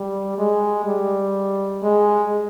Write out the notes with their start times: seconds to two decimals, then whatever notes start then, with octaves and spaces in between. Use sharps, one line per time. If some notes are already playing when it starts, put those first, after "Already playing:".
Already playing: G3
0.38 G#3
0.85 G3
1.82 G#3